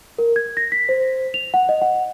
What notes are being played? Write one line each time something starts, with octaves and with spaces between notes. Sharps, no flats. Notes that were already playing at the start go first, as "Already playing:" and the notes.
A#4
G#6
A#6
B6
C5
F7
F#5
D#5
F#5